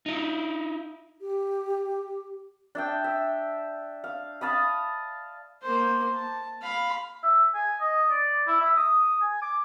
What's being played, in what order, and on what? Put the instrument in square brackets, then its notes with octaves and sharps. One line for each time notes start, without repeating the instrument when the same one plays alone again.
[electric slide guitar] D#4 E4
[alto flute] G4
[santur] D4 E5 G5
E5
F5
F5 A5 B5 D#6
[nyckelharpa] A#3 C5
A5
F5 B5
[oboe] E5
G#5
D#5
D5
E4
E5
D#6
G#5
D6